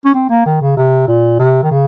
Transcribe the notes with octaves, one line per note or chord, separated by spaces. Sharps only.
C#4
C4
A#3
D#3
C#3
C3
A#2
C3
D#3
C#3